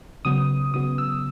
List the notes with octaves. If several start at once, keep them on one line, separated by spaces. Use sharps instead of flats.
C#3 F#3 B3 D#6
C#3 F#3 B3 D#6
E6